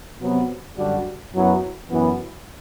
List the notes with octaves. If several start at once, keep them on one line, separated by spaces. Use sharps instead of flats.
C3 F#3 B3
F#2 D3 G3 D4 F#4
F#2 F#3 B3 E4
F#2 E3 B3